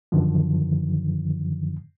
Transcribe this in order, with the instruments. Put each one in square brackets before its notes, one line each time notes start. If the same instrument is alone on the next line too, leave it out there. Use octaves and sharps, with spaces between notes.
[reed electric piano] F#2 D3 D#3 F3